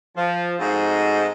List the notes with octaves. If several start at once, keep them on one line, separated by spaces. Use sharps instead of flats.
F3
G#2 A3 C4 D#4 F#4 D#5